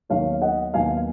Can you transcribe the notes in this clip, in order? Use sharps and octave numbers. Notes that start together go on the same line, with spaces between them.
D#2 D#3 F#3 B3 C#5 F5
D#5 F#5
D#2 D#3 F#3 B3 F5 G#5